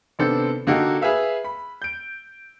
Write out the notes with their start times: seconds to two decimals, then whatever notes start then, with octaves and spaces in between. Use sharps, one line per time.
0.19 C3 D#3 B3 D4 A4 C5
0.67 D3 A#3 D#4 F#4 G4 A4
1.02 G#4 B4 E5 F5
1.44 B5
1.82 G6 D7